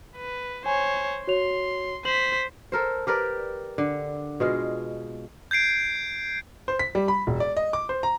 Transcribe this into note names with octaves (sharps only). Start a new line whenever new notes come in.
B4
C5 C#5 G#5
F#4 C#5 C6 F7
C5 B6 F#7
A4 A#4 C5
G4 A#4 B4 D5
D3
B2 G#3 F4
G6 G#6 C7 D7
C5
B6
G3
B5
E1
D5
D#5
D6
C5
A#5